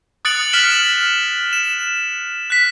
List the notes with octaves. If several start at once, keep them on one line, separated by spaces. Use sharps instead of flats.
D#6 F#6 A6 C#7 D7 F#7
F6 B6 C#7 E7 F#7
E7
E7
F#6 B6